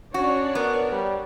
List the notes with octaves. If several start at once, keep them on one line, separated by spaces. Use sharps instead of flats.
C#4 D4 F#4 C#5 D5
B3 A#4
G3